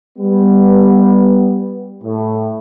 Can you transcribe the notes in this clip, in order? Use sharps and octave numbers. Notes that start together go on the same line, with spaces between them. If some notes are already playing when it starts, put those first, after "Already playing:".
G3 B3
A2